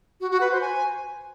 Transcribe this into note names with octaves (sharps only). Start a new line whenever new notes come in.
F#4
F#4
B4
C5
G#5